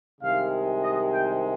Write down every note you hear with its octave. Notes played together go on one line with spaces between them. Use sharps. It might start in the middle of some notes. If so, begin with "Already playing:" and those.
C2 C3 D#3 G#3 F5
D#5
G5